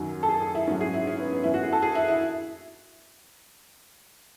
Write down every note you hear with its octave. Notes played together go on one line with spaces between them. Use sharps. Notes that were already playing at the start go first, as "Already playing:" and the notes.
Already playing: F#2 D#3 F#3
A4
G#4
G#4
E4
G#2 F#3 C#4
G#4
E4
C#4
B3
B3
F#2 E3 E4
F#4
G#4
A4
G#4
E4
E4